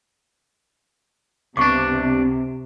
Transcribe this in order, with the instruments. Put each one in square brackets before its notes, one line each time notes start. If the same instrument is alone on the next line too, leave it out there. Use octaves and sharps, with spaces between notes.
[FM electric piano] C#2 B3 [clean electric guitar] G2 D4 [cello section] C3 [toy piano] C#6 D6